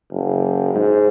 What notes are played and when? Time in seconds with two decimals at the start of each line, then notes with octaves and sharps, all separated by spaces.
0.11 F#1
0.75 G#2